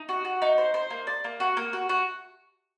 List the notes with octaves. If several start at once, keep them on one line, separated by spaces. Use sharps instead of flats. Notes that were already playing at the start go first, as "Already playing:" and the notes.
Already playing: D#4
F#4
F#4
D#4
C5
C5
A#3
D5
A#3
F#4
A#3
F#4
F#4